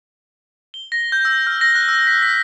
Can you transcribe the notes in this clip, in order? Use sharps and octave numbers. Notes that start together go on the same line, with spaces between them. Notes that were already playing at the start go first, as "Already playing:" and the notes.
G7
A#6
G6
E6
F6
A#6
F#6
E6
B6
B6